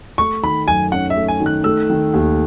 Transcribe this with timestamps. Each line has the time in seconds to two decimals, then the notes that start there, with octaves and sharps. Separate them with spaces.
0.18 A3 C#6
0.43 D#3 B5
0.68 F#2 G#5
0.92 C#4 F#5
1.10 E5
1.16 A3
1.28 G#5
1.40 D#3
1.46 F#6
1.64 A3 E6
1.90 D#3
2.14 D#2